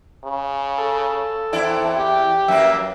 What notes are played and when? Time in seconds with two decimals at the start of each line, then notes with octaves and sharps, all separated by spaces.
0.25 C#3
0.78 A4
1.53 E2 C4 E4 D5
1.96 G4
2.48 F#2 A#3 B4 E5